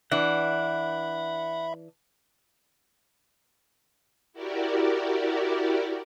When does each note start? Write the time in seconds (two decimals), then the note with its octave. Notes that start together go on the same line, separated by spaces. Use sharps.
0.11 E3 D4 E5 F#5 B5
4.33 E4 F#4 G4 A#4 D5